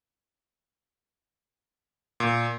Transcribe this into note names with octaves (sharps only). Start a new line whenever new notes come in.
A#2